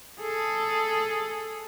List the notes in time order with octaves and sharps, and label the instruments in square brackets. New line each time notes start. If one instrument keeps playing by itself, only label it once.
[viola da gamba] G#4 A4